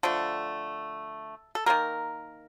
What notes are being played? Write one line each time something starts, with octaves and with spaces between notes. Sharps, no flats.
D3 F3 A3 A4
A4
D#3 G3 A#3 A#4